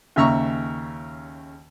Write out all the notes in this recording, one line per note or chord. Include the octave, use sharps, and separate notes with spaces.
D#2 C#3 E5 A#5 C#6